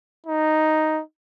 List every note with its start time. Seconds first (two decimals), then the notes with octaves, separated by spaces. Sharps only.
0.27 D#4